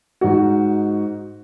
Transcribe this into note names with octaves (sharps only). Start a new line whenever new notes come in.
G#2 D#4 F#4